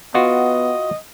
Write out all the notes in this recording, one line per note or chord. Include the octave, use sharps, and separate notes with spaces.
B3 F4 F#4 D#5